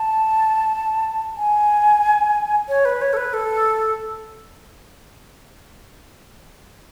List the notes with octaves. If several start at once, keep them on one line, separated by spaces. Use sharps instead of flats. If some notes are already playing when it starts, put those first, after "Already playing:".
Already playing: A5
G#5
C#5
B4
C#5
A4
B4
A4